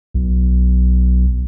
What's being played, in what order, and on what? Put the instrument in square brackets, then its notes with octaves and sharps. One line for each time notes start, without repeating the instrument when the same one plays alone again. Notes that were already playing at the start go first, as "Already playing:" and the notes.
[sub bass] B1